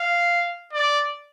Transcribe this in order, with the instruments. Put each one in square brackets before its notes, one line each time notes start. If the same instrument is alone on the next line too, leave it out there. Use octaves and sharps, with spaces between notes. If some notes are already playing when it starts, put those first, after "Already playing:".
Already playing: [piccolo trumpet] F5
D5